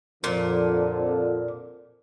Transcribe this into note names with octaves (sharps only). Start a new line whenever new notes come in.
F2 A#2 D3 F3